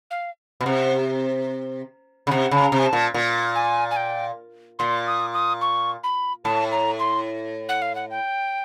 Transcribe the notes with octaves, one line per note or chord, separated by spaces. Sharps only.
F5
B2
C3 F#5
C#3
C3 F#5
C#3 A5
A#5
C3
G#5
A5
A#2
A#2
G#5
G#5
G5
A#2 C6
D#6
D#6
C#6
B5
A2 A5
A#5
C6
F#5
F5
F#5
G5